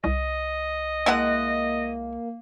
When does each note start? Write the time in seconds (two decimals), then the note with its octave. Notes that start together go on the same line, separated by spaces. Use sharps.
0.04 C2 D#5
1.06 G#3 A#3 E4 F#5